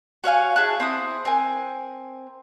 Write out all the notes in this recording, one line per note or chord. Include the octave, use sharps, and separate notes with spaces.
F#4 C#5 F5 G#5
E4 G#4 A5 F#6
C4 E4 D#6
C4 A#4 G#5